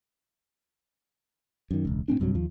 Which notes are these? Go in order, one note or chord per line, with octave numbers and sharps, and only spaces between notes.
F#2 D#3
E1 C#2
A2 F#3 C4 D4
B1 G2 C3 F#3
D#2 F3